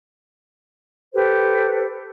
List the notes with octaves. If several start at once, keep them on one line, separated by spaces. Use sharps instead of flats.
G4 A4 B4 C5